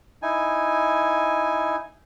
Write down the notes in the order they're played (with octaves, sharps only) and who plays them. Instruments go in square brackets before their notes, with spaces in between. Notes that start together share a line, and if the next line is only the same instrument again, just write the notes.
[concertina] D#4 E4 G#5